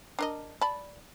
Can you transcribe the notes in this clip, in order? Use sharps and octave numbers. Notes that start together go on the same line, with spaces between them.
D4 A#4 D#5
D5 A5 B5